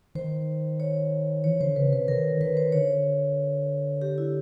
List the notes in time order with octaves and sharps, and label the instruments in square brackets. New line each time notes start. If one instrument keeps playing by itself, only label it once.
[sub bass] D#3 [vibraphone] C5
[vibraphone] C#5
[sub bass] E3 [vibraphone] C#5
[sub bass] D3 [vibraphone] C5
[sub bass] C#3 [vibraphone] B4
[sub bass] C3 [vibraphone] B4
[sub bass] D#3 [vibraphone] A#4
[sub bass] D#3 [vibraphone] B4
[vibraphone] C5
[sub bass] D3 [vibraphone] C#5
[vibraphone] G4
E4